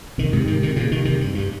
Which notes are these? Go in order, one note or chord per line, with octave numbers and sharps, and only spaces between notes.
C3 D#3
G#2 C3
C3 D#3
C3 D#3
A#2 C#3
C3 D#3
C3 D#3
G2
G2